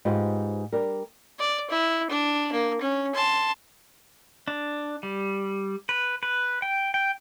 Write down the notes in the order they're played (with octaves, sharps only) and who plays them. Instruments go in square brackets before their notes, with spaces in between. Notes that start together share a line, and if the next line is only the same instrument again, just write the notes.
[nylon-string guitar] G#2 F4 G4 G#4 B4 C5
G3 D4 A#4
[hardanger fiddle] D5
E4
D4
A#3
C#4
A5 C6
[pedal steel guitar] D4
G3
B4
B4
G5
G5